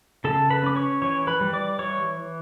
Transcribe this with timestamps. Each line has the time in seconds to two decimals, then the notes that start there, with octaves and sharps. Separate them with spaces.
0.24 C#3 A4 A5
0.50 B4 B5
0.63 C#4 D6
0.76 C#5 C#6
1.02 E3 C#5 C#6
1.27 B4 B5
1.41 G3
1.53 D5 D6
1.79 E3 C#5 C#6